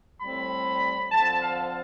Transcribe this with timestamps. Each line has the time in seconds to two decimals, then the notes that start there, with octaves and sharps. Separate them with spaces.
0.20 A2 G3 C4 B5
1.11 D3 F3 C4 A5
1.42 F5